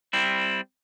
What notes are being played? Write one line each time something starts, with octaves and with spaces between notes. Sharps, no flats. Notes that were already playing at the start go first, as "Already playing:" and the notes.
G3 C4 E4